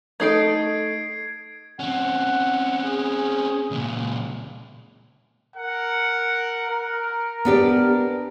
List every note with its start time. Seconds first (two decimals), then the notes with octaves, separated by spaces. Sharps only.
0.20 A3 D#4 A4 G#6 C7 D7
1.79 C4 C#4 F#5
2.83 G#4
3.71 C#2 A#2
5.56 A#4 F#5
6.69 A#4
7.45 B3 D4 G4